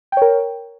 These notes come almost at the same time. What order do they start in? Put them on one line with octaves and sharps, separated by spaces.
G5 C#5 A#4